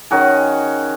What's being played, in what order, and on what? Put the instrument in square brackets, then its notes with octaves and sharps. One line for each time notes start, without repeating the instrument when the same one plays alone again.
[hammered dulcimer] D#3 C#4 F#4 G#4